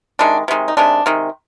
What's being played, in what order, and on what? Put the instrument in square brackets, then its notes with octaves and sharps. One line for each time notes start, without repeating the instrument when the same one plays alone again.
[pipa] C3 D#3 G#3 D4
C3 D#3 G#3
D#4
C3 D#3 G#3 D4
C3 D#3 G#3